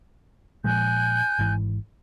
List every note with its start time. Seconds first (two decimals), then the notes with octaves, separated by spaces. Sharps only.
0.64 A#2 F3 G#3 G#5 F#6 G6
1.39 G#1 G#2 E3